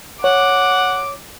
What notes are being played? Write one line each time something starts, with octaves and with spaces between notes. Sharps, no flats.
C#5 F#5 D6